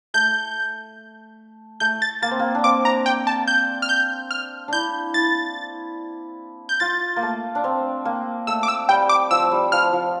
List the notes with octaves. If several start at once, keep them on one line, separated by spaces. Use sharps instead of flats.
A3 G6
A3 G6
A6
A#3 A6
C4
A#3
D4
C4 D6
A#5
G5
A5
G6
F6
G6
F6
D4 E4 G6
E4 A6
G6
F4 A6
A#3
A3
D4
C4
A#3
A3 E6
D6
E6
G3 G5
D6
F3 E6
G3
F3 F6
F3